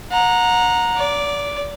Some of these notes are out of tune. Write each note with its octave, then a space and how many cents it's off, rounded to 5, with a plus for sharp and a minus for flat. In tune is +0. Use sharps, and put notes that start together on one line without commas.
F#5 -30 A#5 +0
D5 -30 D6 +0